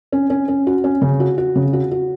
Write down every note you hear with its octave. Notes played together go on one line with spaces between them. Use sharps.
C#4
C#4
C#4
F#4
C#4
C#3
F#4
F#4
C#3
F#4
F#4